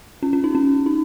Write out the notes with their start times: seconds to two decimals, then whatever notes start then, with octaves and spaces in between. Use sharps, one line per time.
0.23 C#4
0.33 C#4
0.44 D#4
0.55 C#4
0.86 D#4